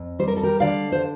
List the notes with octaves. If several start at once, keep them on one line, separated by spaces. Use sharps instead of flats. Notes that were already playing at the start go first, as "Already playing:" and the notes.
Already playing: F2
G3 C5
A#4
A4
G4 A#4
D3 D5 F5
C5